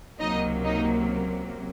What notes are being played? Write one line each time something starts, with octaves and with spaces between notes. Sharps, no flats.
C#2 C3 F#3 A#3 D#4 D#5
D#4 D#5